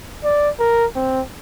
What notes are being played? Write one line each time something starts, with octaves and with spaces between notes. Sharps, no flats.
D5
A#4
C4